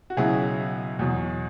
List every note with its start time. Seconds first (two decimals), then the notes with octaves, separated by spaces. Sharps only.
0.10 F#4
0.17 C#2 B2 F#3 E4 G#4
0.99 E2 B2 F#3